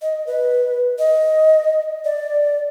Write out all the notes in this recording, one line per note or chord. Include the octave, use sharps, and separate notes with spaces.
D#5
B4
D#5
D5